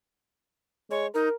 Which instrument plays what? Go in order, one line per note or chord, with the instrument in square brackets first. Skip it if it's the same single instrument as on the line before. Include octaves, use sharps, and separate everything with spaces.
[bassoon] G#3 [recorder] C#5
[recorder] D#4 [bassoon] A#4